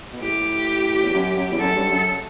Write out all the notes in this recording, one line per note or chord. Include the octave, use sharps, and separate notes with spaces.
B2
A2 G4
E2
F#2
F#2
E2
F#2 A4
G2
F#2